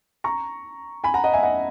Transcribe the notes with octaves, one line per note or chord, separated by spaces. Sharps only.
A#5 C#6
G#5 B5
F#5 A#5
D#5 F#5
E5 G#5
D#5 F#5